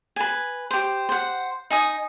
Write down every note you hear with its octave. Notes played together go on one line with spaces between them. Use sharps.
B4 G#5
G4 C5
C5 F#5
D#4 G#5 D#6